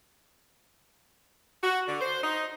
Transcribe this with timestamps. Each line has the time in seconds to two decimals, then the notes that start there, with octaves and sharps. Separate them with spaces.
1.63 F#4
1.87 D3
2.01 C5
2.23 D#4